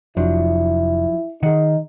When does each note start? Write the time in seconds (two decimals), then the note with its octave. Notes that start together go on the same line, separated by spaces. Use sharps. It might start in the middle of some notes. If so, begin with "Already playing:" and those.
0.17 F1 F3 F#3 D4 E4
1.43 D#3 D#4 G#4 F#5